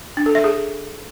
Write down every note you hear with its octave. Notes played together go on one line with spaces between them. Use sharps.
D4
A4
E5
G#4